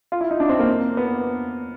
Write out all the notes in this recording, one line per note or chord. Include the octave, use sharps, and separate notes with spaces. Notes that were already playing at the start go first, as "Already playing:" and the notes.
F4
E4
D#4
D4
C4
A#3
B3